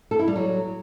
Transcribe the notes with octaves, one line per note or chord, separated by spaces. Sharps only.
A4
E4
G3
F#3